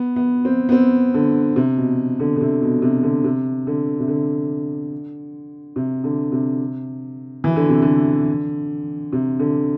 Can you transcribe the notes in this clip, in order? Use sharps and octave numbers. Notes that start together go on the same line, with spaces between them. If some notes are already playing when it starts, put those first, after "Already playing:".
Already playing: B3
B3
C4
B3
C4
D3
C3
B2
D3
D3
C3
B2
C3
D3
C3
D3
C3
D3
C3
D3
C3
E3
D3
C3
D3
C3
D3